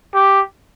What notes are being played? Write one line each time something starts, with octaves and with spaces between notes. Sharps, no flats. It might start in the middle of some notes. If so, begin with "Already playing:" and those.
G4